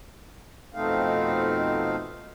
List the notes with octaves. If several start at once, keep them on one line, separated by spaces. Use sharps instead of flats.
F2 B2 A3 C4 D#4 F5